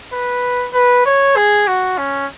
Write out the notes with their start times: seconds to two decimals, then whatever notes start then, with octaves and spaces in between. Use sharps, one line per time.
0.12 B4
0.74 B4
1.06 C#5
1.36 G#4
1.68 F#4
1.98 C#4